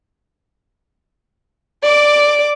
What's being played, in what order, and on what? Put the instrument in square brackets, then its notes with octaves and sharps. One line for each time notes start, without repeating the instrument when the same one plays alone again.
[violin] D5 D6